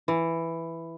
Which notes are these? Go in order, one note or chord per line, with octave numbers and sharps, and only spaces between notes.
E3